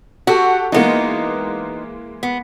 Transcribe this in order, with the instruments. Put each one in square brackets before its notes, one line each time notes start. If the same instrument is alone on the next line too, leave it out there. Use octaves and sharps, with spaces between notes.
[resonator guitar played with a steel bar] F#4 [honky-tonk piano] G4 A4 F#5
[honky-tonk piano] E3 G#3 A#3 [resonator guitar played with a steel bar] B3 D#4
[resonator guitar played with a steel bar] B3